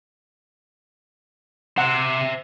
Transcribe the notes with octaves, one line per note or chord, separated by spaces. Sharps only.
C3 C5 E5 F#5